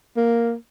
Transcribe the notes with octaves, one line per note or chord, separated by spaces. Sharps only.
A#3